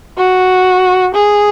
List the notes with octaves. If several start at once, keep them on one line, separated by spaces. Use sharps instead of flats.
F#4
G#4